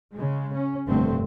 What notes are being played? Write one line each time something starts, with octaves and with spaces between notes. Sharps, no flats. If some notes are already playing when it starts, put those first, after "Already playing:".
C#3 G#3
C#4
F1 G2 D3 A3 C4